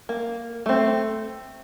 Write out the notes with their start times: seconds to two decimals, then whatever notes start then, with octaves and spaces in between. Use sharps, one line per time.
0.09 A#3
0.66 A3 C4